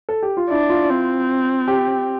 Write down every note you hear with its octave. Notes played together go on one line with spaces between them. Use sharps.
A4
G4
F4
D4 E4
F4
C4
G4